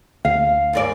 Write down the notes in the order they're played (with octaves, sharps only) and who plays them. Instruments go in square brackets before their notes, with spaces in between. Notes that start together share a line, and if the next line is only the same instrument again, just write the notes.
[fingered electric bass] D2 [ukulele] F5
[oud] D#2 G#2 D5